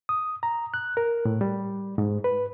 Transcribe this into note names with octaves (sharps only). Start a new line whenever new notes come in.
D#6
A#5
F#6
A#4
A2
G3
G#2
B4